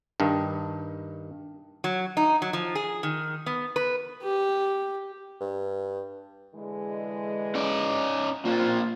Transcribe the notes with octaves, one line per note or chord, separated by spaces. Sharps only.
G2 D#3
F#3
D#4
F#3
F3
G#4
D#3
B3
B4
G4
G2
D3 E3 G#3
C#4 D#4 D5
A#3 C4 D4 F4